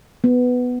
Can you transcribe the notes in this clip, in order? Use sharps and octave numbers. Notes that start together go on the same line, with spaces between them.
B3